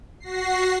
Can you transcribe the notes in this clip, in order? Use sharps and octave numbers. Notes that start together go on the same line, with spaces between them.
F#4 A#6 C7